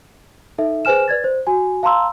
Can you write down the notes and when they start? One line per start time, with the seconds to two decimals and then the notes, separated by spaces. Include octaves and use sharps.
0.58 D#4 A4 E5
0.85 G#4 B4 C5 G#5 F6 E7
1.08 B4 D5 G#6 A6
1.24 C5
1.47 F#4 G#5
1.83 F5 A5 A#5 C6 E6